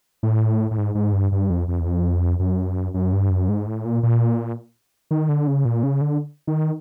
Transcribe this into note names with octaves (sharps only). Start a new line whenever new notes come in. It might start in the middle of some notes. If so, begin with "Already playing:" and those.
A2
A2
G#2
G#2
G2
G2
F2
F2
E2
F2
F#2
F#2
G2
F#2
G#2
A2
A#2
A#2
D#3
D3
C#3
A#2
C#3
D3
D#3